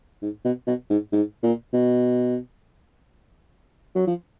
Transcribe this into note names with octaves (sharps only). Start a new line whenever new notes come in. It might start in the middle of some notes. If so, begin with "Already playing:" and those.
G#2
B2
B2
G#2
G#2
A#2
B2
F#3
F3